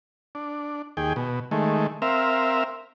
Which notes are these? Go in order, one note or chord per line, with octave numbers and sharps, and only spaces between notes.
D4
D#2 G#4 G5
B2
D#3 G#3 A3
C4 A#4 E5 F5